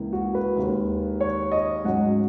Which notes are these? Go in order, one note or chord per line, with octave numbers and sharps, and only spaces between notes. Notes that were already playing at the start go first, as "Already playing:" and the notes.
Already playing: C#2 C#3 E3 A#3
F#4
B4
D#2 D#3 G#3
C#5
D#5
G#2 F#3 C#4 F#5